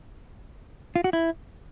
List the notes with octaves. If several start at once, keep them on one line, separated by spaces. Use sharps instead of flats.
F4
F#4
E4